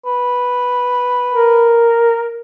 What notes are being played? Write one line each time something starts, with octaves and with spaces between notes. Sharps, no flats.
B4
A#4